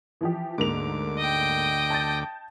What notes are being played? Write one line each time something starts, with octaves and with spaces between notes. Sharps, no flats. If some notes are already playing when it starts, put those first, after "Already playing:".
E3 F3 G4
D2 G#2 A#3 D6 F7
D#5 G5
A5 G6 A6